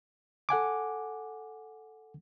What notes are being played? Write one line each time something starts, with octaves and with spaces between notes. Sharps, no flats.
A4 F#5 G#5 D6